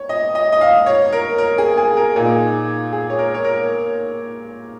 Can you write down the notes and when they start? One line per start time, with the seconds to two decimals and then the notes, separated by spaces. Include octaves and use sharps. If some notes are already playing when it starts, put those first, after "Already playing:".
Already playing: C#5
0.09 D#5
0.35 D#5
0.52 D#5
0.61 F5
0.86 C#5
1.12 A#4
1.38 A#4
1.58 G#4
1.77 G#4
1.97 A#4
2.16 A#2 A#3 D#4 G#4
2.93 G#4
3.10 C#5
3.19 A#4
3.34 C#5
3.44 A#4